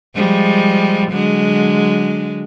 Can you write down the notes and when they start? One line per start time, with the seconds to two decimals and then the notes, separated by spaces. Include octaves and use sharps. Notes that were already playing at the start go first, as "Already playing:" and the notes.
0.16 F3 G3 G#3
1.12 D3 F#3 G#3